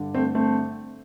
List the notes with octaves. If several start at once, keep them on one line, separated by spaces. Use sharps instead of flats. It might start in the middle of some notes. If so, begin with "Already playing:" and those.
Already playing: G2 D3
A3 C4
A3 C4